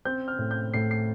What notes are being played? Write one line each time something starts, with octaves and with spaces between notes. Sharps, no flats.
C4 G6
F6
A2
G6
A2 C7
C7